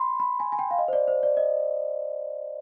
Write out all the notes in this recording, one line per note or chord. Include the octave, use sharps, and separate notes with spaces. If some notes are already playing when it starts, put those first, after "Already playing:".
Already playing: B5 C6
B5
G#5
G#5
G5
F5
D#5
C5
D5
C5
D5
D#5